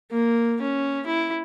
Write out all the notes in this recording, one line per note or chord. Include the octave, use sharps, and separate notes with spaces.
A#3
C#4
E4